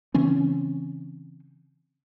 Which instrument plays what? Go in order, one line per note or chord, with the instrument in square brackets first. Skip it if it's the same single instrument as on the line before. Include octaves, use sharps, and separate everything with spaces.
[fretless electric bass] C#3 E3 C4 C#4